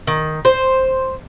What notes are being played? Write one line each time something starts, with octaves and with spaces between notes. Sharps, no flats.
D#3
C5